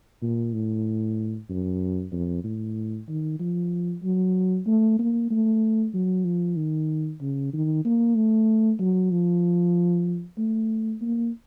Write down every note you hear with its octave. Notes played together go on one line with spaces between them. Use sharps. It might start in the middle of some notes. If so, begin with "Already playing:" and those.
A#2
A2
F#2
F2
A2
D#3
F3
F#3
A3
A#3
A3
F#3
F3
D#3
C#3
D#3
A#3
A3
F#3
F3
A3
A#3